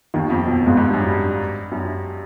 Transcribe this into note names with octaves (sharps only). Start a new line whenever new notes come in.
D#2 D#3
F2 F3
B1 B2
G#1 G#2
G#1 G#2
G2
F#2
G2
F#2